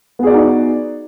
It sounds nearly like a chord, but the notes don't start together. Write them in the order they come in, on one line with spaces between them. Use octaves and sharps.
B3 G#4 D5 F#4 D#4